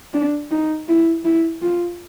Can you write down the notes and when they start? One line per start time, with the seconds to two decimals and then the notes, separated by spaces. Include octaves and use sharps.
0.14 D4
0.51 D#4
0.88 E4
1.25 E4
1.62 F4